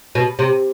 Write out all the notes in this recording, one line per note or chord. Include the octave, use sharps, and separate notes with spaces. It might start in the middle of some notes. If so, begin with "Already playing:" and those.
B2
C3